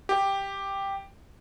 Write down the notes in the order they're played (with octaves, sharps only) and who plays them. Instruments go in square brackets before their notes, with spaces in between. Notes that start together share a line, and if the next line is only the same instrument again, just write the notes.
[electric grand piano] G4